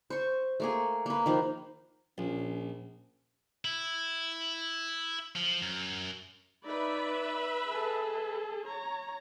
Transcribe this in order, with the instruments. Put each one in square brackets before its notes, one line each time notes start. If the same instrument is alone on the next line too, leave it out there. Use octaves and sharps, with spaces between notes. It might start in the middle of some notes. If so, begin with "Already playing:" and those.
[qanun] C5 C#6
A3 A#3 G#4
A#3 B4
D#3 F3
[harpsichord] A#1 [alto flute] C#4
[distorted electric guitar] E4
F3
F#2
[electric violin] D#4 D5 [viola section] B4 E5 B5
[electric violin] G#4 A4
C#5 A#5